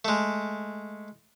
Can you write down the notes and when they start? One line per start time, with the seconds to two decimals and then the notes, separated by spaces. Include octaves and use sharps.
0.05 G#3 A3